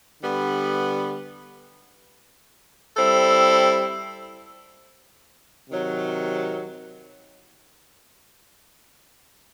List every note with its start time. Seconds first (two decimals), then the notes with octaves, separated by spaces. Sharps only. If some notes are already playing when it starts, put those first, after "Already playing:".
0.22 D3 G3 B3
2.96 G3 C4 E4 A4
5.70 C3 D#3 F#3